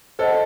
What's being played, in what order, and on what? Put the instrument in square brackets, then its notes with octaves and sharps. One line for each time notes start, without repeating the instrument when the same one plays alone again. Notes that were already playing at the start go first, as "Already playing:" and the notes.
[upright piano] A4 [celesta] C5 D#5 F#5